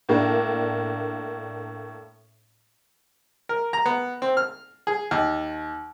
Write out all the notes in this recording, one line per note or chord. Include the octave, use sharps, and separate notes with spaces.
A2 A#3 D4
A#4
A#5
B3
C4
F6
G#4
D#2